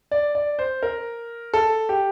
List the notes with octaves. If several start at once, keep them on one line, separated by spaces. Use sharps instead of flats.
D5
D5
C5
A#4
A4
G4